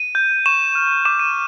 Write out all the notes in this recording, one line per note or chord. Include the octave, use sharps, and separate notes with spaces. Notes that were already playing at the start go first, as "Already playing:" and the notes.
Already playing: D#7
G6
C#6 E7
F6
D6 E7
D#7